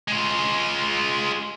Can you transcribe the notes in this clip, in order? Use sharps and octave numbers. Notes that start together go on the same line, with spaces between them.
G#3 F4